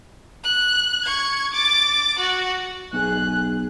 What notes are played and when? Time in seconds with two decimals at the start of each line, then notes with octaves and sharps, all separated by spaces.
0.44 F#6
1.05 C#6 G#6
1.53 D6 A6
2.19 F#4
2.93 B1 G#4 F#6